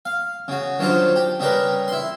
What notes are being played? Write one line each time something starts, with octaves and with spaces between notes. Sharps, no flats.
F5
C#3 F#4
D#3 F#3 D4 F4 C5
G4
C#3 G3 G4 A#4 B4
E4 C6